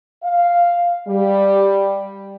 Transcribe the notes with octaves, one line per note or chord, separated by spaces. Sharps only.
F5
G3